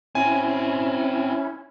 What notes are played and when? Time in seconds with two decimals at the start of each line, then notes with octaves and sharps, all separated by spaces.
0.15 C4 C#4 E4 F#4 G#5